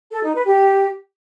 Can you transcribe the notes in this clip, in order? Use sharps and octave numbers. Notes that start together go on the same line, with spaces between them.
A4
D#4
B4
G4